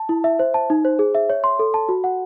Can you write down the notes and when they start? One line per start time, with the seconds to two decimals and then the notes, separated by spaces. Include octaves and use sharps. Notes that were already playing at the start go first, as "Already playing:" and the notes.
Already playing: A5
0.09 E4
0.24 E5
0.39 C5
0.54 A5
0.70 D#4
0.85 C5
0.99 G#4
1.15 E5
1.30 C#5
1.44 C6
1.59 A4
1.74 A5
1.89 F#4
2.04 F#5